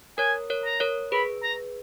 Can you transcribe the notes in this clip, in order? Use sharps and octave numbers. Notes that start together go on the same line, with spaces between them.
A#4 C#5 G#5
A#4 C#5
A#5
A#4 C#5
G#4 B4 B5
A#5